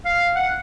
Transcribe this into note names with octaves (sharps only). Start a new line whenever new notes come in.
F5
F#5